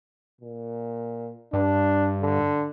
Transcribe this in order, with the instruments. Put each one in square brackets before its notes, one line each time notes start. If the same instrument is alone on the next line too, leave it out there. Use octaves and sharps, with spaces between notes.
[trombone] A#2
[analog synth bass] G2 [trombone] D4
[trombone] D3